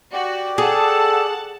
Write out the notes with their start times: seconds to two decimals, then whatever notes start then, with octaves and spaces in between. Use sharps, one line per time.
0.13 F#4 G4 D5
0.58 G#4 A4 F#5 A5